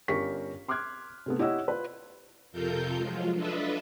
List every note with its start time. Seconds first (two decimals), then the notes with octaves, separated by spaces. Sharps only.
0.08 G1 C#4 G4 A#4 C#6 B6
0.68 C6 D6 F6 F#6 G#6
1.26 C3 A3 B3
1.39 E4 G4 C#5 D#5 F#5 E6
1.68 F4 B4
2.52 F2 C3 F4 A4 A#4 G6
2.97 F3 F#3 G#3 F4
3.35 D4 F4 A4 B4 D#5 E5